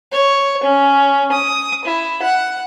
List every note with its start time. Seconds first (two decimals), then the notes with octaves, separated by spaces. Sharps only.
0.12 C#5
0.63 C#4
1.32 D#6
1.85 E4
2.22 F#5